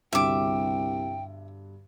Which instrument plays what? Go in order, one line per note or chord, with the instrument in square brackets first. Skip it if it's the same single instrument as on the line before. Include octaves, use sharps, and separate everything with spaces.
[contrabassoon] C2 [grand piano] G2 B2 D3 [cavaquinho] E5 D6 [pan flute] G5